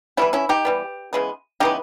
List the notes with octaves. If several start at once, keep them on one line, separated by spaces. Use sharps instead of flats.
E3 G3 B3 C#4 E4
C#4 E4
D#4 G4
E3 G3 B3
C#3 E3 G#3 B3
C#3 E3 G#3 B3 D#4 G4